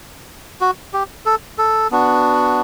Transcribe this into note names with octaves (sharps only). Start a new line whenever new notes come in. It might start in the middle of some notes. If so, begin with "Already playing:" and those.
F#4
G4
A4
A4
B3 D4 F#4